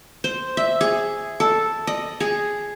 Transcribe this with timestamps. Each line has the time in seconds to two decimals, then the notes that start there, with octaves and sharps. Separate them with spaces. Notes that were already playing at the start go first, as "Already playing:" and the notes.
0.24 C5
0.57 E5
0.81 G#4
1.40 A4
1.87 D#5
2.20 G#4